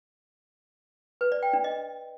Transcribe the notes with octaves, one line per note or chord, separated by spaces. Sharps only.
B4
D5
G5
D4
D#5